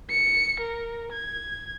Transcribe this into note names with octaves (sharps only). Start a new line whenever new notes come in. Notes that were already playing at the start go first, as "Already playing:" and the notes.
C#7
A#4
G#6